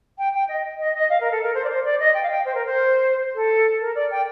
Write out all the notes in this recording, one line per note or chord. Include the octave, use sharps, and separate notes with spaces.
G5
G5
D#5
D#5
D#5
F5
A#4
A4
A#4
C5
D5
C5
D5
D#5
G5
F5
G5
C5
A#4
C5
A4
A#4
D5
G5